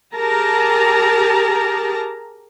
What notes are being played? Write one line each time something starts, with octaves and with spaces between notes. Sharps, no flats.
G4 G#4 A#4 A5 A#5